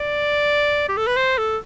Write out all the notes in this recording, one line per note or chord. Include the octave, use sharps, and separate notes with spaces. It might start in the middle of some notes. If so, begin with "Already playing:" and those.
Already playing: D5
G4
A4
B4
C5
A4